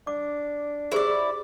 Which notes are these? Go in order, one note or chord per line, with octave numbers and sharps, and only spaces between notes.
D4 D6
E4 G4 G#4 C5 D5